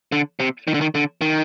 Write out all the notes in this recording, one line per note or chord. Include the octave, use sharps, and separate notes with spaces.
D3
C3
D#3
D3
D#3
D3
D#3